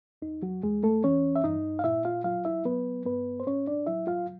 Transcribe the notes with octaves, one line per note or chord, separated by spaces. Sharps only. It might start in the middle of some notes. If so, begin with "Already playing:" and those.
E2 D#4
F#3 F#4
E2 G#3 G#4
A3 A4
E3 C#4 C#5
E5
G2 D#4 D#5
F5
A#2 E4 E5
F4 F5
F#3 F4 F5
E4 E5
F#3 B3 B4
G2 B3 B4
C5
A2 C#4 C#5
D4 D5
F#3 E4 E5
F4 F5